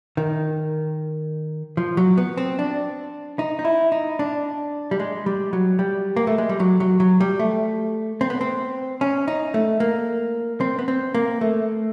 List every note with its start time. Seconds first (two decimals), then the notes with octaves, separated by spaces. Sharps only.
0.17 D#3
1.77 F3
1.97 F#3
2.17 B3
2.37 C4
2.59 D4
3.39 D#4
3.59 D#4
3.65 E4
3.92 D#4
4.19 D4
4.91 G3
5.00 G#3
5.26 G3
5.53 F#3
5.79 G3
6.17 A#3
6.27 A3
6.38 G#3
6.49 G3
6.60 F#3
6.80 F#3
7.00 F#3
7.20 G3
7.40 A3
8.21 C4
8.30 B3
8.41 C4
9.01 C#4
9.28 D#4
9.54 A3
9.80 A#3
10.61 C4
10.79 B3
10.88 C4
11.15 A#3
11.41 A3